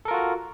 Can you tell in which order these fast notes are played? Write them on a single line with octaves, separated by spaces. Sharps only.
A4 A#4 F4 F#4